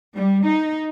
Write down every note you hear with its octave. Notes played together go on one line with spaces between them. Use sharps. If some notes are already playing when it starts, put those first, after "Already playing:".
G3
D#4